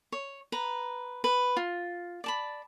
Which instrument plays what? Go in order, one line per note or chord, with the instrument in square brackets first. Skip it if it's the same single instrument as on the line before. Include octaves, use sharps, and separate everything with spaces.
[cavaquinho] C#5
B4 A#5
B4
F4
D5 A5 B5